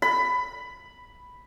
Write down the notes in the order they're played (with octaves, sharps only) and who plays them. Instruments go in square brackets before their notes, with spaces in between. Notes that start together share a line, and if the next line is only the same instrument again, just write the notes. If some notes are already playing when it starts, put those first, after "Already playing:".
[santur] B5